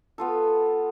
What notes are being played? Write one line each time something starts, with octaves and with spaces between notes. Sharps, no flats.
B3 F4 A4